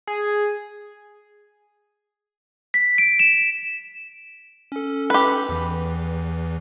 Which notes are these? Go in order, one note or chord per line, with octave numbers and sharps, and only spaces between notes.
G#4
B6
D7
E7
C#4 A4
G4 B4
E2 E3